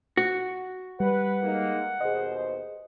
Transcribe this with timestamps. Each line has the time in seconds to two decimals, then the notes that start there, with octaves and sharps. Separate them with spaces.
0.17 F#4
1.00 G3 B4 F#5
1.43 G#3 A#3 D#4
2.01 D#2 B2 G#4 C5 D#5